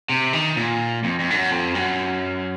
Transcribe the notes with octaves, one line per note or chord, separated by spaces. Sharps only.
C3
D#3
A#2
F2
F2
G#2
F#2
F2
F#2